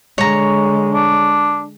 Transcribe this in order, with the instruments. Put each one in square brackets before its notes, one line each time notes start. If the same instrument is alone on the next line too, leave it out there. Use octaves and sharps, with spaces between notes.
[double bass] D3 G#3 [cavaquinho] C#5 A#5
[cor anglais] D4